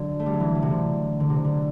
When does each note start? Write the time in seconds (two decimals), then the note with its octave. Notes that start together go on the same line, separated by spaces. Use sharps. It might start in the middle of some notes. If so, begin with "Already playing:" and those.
Already playing: D3 F#3
0.20 A3
0.26 G3
0.33 F#3
0.40 E3
0.55 F#3
0.62 C3
0.70 D3
1.20 D3
1.30 C3
1.44 D3